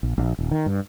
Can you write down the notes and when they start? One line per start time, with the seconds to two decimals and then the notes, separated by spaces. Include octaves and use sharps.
0.03 A#1
0.18 A#1
0.38 D#1
0.51 D#3
0.66 G2